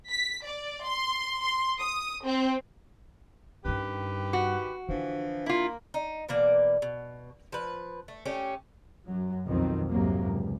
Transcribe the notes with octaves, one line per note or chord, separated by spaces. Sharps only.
B6
D5
C6
C6
D#6
C4
G2 D#3 C#4 G4 B4
F#4
D3 E3 F3 D4
A#3 E4 F4
D#4
B2 E3 A#3 D5
B2
F3 B4
A3
A3 C#4 G4
F#2 F#3
B1 F2 D#3 C4
C2 F2 G#2 C3 F#3 A#3
C#2